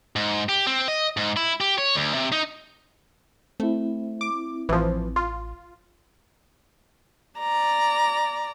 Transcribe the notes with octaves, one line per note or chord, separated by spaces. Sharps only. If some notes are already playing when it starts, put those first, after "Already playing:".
G#2
G4
C4
D#5
G#2
E4
G4
C#5
D2
C3
D#4
A3 C4 E4
D6
A1 E3 F3
F4
D5 A#5